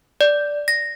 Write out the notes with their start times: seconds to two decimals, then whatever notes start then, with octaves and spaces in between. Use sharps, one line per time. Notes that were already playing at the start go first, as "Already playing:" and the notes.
0.21 D5
0.68 A#6